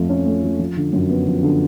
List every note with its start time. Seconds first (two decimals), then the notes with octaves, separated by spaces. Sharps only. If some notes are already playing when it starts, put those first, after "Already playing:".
Already playing: F2 F3 A3
0.10 C#4
0.26 A3
0.44 F3
0.59 F3
0.77 D3
0.93 F#2
1.10 B3
1.27 F3
1.43 D3